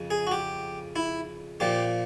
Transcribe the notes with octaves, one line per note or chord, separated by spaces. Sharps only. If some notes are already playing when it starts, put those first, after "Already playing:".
Already playing: F2 C#3
G#4
F#4
G4
E4
A#2 F3 G4